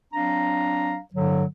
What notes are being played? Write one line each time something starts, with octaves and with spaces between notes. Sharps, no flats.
F#3 C4 D4 F5 A#5
G2 D3 F#3